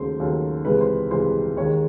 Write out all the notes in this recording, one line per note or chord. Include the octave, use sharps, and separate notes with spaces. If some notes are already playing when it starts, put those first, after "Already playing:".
Already playing: D#2 C#3 F#3 A3 C5
D#2 C#3 F#3 A3
C#2 C3 E3 G#3 B4
C5
C#2 C3 E3 G#3 C5
D#2 D#3 G#3 C#5